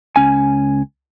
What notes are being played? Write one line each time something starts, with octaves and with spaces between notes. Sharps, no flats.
C#2 C#4 G#5